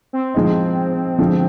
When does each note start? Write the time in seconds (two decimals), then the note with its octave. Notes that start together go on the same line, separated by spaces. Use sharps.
0.13 C4
0.34 F3 G#3 D#4
1.18 D3 F3 G#3